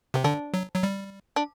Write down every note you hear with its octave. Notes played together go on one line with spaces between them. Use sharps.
C3 C4
D3 D4
F#3
F#3
G3
D4